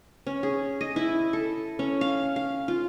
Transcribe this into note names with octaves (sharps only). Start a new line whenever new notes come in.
C#4
G#4
D#5
E4
A4
C#4
F5
F5
F4